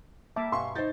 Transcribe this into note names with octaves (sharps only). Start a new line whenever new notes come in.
G3 A#3 E5 A5 D6
G2 B2 F5 G#5 C6 C#6
D#4 C5 G6 A6